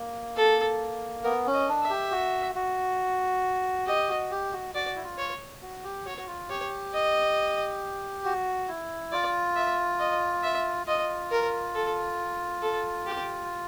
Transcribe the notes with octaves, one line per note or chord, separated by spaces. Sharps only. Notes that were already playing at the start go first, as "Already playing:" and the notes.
Already playing: A#3
A4
B3 A#4
C#4
D#5
D4
E5
G4
F#4
F#4
G4 D#5
F#4
G4
F#4
F#4 D5
E4
F4
C#5
F#4
G4
F#4 C#5
F#4
F4
G4 C#5
D#5
F#4
E4
F4 D5
E5
D#5
E5
F4 D#5
A#4
A4
A4
G4